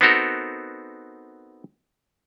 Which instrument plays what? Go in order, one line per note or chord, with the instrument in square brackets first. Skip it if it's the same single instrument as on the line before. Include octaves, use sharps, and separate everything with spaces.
[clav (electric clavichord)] B3 C4 D#4 F#4 A4 A#4